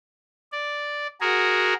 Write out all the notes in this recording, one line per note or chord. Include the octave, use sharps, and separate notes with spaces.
D5
F#4 G#4 A#4